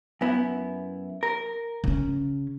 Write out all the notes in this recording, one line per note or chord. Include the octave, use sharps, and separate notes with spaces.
F#2 B3 E4
A#4
C#3 C#4